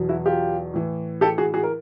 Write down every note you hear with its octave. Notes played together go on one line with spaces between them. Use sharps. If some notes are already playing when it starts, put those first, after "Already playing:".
Already playing: E2 B2 F#3
E4 F#4
F4 G4
A2 E3
G4 A4
F#4 G#4
F#4 G#4
A#4